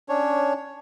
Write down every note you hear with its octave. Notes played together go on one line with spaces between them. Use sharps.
C#4 D4 C#5